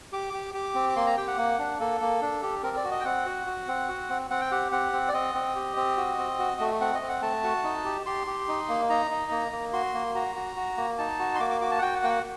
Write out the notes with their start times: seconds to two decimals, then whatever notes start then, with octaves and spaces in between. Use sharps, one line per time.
0.12 G4 D6
0.33 G4
0.54 G4 D6
0.75 C4
0.89 D6
0.96 A#3 C6
1.06 A#5
1.17 G4 G5
1.28 F#5
1.38 A#3
1.59 D4
1.80 A#3 A4
2.01 A#3
2.21 D4
2.43 G4
2.63 C4 A#4
2.77 D5
2.84 F#4
2.91 D#5
3.00 G5
3.05 C4 F#5
3.26 F#4
3.47 F#4
3.68 C4
3.89 F#4
4.09 C4
4.30 C4 F#5
4.41 G5
4.51 G4 F#5
4.72 C4 F#5
4.93 C4
5.09 D5
5.14 C4 D#5
5.35 C4
5.56 G4
5.76 C4
5.97 F#4
6.18 C4
6.39 F#4
6.60 A3
6.80 C4 F#5
6.95 D#5
7.02 C4
7.09 F#5
7.22 A3 A5
7.44 F#4
7.64 D#4
7.85 G4
8.06 G4 C6
8.27 G4
8.48 D#4
8.69 A#3
8.90 D#4 A#5
9.11 D#4
9.31 A#3
9.52 A#3
9.73 F#4 C6
9.94 A#3
10.15 F#4 A#5
10.36 F#4
10.56 F#4
10.77 A#3
10.98 D#4 A5
11.19 F#4
11.35 C6
11.40 A#3 D6
11.50 D6
11.61 F#4 D6
11.71 A5
11.78 F#5
11.82 F#4 G5
11.96 F#5
12.03 A#3 G5
12.10 F#5